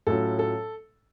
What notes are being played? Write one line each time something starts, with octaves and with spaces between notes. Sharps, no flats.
A2 F#3 C#4 F4 A4
A4